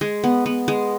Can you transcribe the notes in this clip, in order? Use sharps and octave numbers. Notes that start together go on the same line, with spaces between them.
G#3
B3
B3
G#3